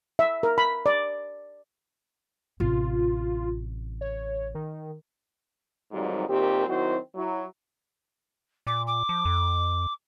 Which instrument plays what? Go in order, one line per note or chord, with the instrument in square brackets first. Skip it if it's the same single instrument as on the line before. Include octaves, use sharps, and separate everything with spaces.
[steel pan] E5
A#4
B5
D5
[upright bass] A1 C3 [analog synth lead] F4
[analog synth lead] C#5
D#3
[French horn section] F2 G#2 D#3 F#3 G3
A#2 D#3 C4 G4
D#3 F#3 C4 E4 F#4 C5
F#3 E4
[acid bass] A#2 [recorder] D6
[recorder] D6
[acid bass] F3
F2